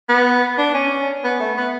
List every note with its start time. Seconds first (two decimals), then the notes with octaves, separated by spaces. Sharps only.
0.09 B3
0.58 D4
0.74 C#4
1.24 B3
1.40 A3
1.57 B3